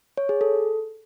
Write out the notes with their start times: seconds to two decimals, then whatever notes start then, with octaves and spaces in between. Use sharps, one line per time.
0.17 C#5
0.29 G#4
0.41 A4